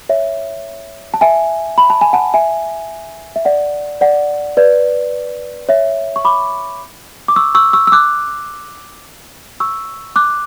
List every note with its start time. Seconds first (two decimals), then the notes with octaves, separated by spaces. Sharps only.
0.09 C#5 E5
1.14 A5
1.21 E5 G#5
1.78 B5
1.90 A5
2.01 G#5
2.13 F#5 A5
2.34 E5 G#5
3.36 E5
3.45 D5 F#5
4.01 D5 F#5
4.57 B4 D5
5.69 C#5 E5
6.16 C#6
6.25 B5 D6
7.28 D6
7.36 C#6 E6
7.55 C#6 E6
7.73 C#6 E6
7.87 E6
7.92 D6 F#6
9.60 C#6 E6
10.16 D6 F#6